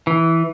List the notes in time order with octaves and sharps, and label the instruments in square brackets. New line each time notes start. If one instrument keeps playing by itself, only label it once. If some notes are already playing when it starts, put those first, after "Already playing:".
[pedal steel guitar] E3